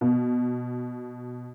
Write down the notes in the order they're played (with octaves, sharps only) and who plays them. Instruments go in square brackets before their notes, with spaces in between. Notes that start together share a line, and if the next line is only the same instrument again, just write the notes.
[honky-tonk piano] B2